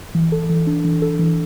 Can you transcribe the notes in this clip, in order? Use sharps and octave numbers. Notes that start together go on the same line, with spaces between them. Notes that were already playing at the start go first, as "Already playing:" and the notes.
E3
A4
E3
D4
E3
A4
E3